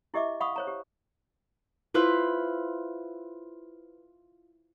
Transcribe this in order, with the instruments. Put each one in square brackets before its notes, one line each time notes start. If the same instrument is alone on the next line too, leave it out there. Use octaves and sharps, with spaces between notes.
[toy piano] E4 G4 D#5 E5 D6
F5 F#5 B5 C#6 D#6
C5 C#5 A#5
G4
[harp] E4 F4 B4 C5